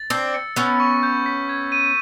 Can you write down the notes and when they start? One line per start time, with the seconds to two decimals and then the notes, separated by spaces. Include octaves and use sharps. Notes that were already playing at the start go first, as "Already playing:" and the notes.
Already playing: A6
0.10 C4 D4 E6
0.34 C#7
0.56 B3 C#4 E6
0.80 C#6
1.03 G6
1.26 B6
1.49 G#6
1.72 D#7